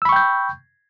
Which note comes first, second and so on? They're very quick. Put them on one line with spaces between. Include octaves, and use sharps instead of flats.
E6 B5 C#6 G5 G6